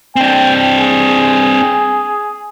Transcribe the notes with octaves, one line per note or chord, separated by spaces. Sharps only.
C4 D4 G5
G#4